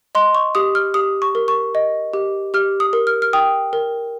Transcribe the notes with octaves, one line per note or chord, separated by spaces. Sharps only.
D#5 C6
C#6
G4 D#6
F6
G4 D#6
C#6
A#4
C#6
D#5
G4
G4 F6
D#6
A#4
F6
F6
G5 D#6
A#4